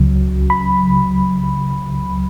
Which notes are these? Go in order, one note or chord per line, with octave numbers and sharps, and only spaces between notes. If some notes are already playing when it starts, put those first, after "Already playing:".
Already playing: C#2 C#3 F#3
B5